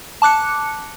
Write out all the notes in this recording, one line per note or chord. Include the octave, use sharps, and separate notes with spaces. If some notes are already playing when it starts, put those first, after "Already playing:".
A5 D6 F#6 C#7